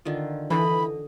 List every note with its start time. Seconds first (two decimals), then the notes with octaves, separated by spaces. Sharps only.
0.05 D3 D#3 F4
0.50 D3 E3 D#5 B5